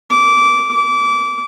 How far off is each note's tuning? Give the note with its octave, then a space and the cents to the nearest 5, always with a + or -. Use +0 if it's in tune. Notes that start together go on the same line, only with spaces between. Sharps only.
D6 -15
D6 -25